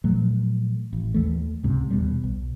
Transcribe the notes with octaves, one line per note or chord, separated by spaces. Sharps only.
A#2 F3 F#3 A3
A1
D#2 E3 A3
C#2 G#2 C3
D#2 B2 G3
B1